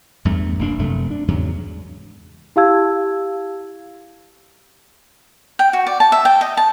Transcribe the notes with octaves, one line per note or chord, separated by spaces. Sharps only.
E2 G2 A3
F1 A#3 D4
F1 F#2 C3 A3
D4
E2 G#2 C#3 F#3
E4 G4 F5 A5 E6 G#6
G5
F#4
D5
A5
E5
G5
D#5
A5